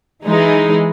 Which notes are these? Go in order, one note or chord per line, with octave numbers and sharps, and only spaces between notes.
E3 G#3 D#4